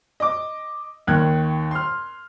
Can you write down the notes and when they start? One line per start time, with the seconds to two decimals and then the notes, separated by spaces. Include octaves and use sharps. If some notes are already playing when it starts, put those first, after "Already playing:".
0.20 D#5 D6
1.07 D#2 D#3 F#6 G#6
1.71 C6 F6